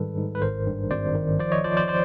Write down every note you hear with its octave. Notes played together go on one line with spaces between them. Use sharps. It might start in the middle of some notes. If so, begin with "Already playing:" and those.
Already playing: G#2 D#3 G3 A4 B4
G#2
B4
G#1 A#4 C5
G2
G#1 C5 D5
D#3
F3 C5 D5
C#5 D#5
F3 C5 D5
C5 D5
C5 D5